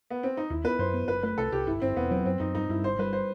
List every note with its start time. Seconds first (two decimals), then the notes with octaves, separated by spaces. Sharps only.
0.10 B3
0.23 C4
0.37 D#4
0.50 D#2 E4
0.64 B3 B4
0.79 F#2 C5
0.94 B3
1.08 F#1 B4
1.23 A3 B4
1.38 C2 A4
1.52 C2 G4
1.67 G1 E4
1.82 G1 C4
1.96 E1 B3
2.11 F#3 C4
2.25 F#2 C4
2.40 F#2 D#4
2.55 G2 D#4
2.69 G2 E4
2.84 G1 C5
2.99 G3 B4
3.13 C5